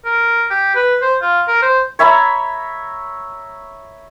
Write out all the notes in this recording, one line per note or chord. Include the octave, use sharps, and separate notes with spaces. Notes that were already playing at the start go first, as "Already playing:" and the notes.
A#4
G4
B4
C5
F4
A#4
C5
C#5 E5 A#5 B5